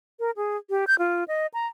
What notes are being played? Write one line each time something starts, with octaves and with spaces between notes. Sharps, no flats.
A#4
G#4
G4
G6
F4
D#5
A#5